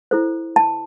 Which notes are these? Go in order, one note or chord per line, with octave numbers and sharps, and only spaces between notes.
E4 A4 C5
A5